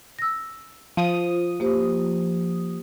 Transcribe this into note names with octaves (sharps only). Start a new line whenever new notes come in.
E6 A#6
F3 D#6
A#3 G4 C5